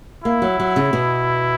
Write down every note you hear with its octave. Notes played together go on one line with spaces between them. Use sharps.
A#3 E4
F#3
F#3
C#3
B2